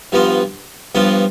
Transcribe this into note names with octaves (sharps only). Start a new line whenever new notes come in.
G2 F3 B3 F4
G2 F3 B3 F4